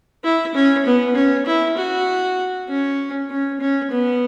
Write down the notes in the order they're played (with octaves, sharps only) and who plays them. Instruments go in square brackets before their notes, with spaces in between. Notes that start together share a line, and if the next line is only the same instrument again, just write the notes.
[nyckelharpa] E4
C#4
B3
C#4
E4
F#4
C#4
C#4
C#4
B3